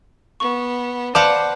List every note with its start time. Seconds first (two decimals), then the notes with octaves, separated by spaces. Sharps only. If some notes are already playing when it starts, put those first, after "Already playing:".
0.40 B3 C#6
1.15 B4 C5 D5 F5 F#5 A5